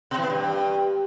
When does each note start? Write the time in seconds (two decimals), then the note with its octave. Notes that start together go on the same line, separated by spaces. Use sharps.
0.11 B2
0.17 E3
0.24 B3
0.30 G2